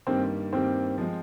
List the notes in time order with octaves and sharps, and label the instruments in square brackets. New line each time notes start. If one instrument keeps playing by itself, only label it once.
[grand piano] G2 D#3 G3 A#3 [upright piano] C4
[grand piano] G2 D#3 G3 A#3 [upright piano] C4
[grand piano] F3 G#3 C4